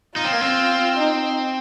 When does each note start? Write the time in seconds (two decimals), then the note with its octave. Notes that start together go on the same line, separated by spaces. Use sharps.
0.16 D#4 F4
0.25 C4
0.33 A#3
0.41 C4
0.97 D#4